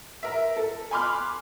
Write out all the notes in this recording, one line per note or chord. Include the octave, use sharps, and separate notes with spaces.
A#4 E5
A4
G#5 B5 C6 D6 F6 F#6